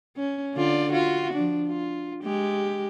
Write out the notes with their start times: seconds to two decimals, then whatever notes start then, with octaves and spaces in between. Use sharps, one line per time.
0.17 C#4
0.55 D3 F4 D5
0.92 F4 F#4
1.33 F3 D4
1.68 F4
2.23 G#3 G4